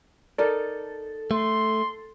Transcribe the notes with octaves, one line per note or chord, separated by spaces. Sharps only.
D#4 A4 A#4 D5
A3 C6